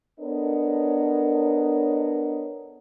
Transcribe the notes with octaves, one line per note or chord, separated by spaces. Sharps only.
B3 D4 A4 A#4 C#5 D#5